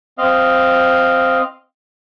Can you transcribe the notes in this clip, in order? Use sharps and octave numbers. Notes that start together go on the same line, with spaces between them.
C4 D#5 F5